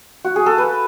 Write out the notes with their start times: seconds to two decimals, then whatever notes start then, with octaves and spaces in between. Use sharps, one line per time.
0.25 F#4
0.36 G#4
0.46 A4
0.58 B4